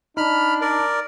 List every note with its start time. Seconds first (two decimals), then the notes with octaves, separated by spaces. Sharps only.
0.17 D4 D#4 B5 F6
0.61 A#4 D5